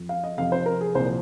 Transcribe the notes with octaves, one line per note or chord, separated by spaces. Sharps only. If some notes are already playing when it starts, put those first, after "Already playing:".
Already playing: F2 F3
F5
D#5
F2 C3 F3 F5
C5
A#4
G#4
C2 A#2 F3 C5